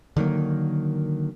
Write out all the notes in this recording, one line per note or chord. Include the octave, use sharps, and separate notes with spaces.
D3 D#3 F#3 A#3